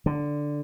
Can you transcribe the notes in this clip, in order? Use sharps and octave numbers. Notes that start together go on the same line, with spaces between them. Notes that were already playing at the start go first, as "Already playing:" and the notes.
D3